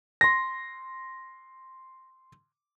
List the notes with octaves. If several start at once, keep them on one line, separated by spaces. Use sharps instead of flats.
C6 A#6